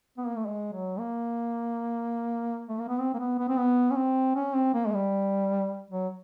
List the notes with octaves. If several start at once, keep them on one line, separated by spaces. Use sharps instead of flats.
B3
A#3
A3
G#3
F#3
A#3
A3
A#3
B3
C4
A#3
B3
B3
C4
B3
C#4
C4
C#4
C4
A#3
G#3
G3
F#3